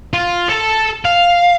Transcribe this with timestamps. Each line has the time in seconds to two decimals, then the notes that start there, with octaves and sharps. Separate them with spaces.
0.13 F4
0.48 A4 A5
1.05 F5